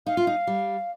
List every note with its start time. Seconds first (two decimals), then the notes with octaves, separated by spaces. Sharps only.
0.07 D#4 F5
0.17 F4
0.27 D#4
0.47 G3